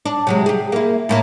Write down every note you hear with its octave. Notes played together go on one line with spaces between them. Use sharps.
D4
C3 F#3 G#3
G4 G#4
A#3 E4
A2 A#3 E4